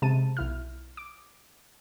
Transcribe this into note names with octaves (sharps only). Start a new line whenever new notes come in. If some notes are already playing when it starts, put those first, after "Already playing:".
C3 G#3 A5 D#7
B1 E4 F6
D6